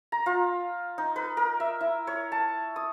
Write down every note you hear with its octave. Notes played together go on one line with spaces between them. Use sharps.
A#5
F4
D#4
B4
A#4
E5
E4
C#5
A5
D#6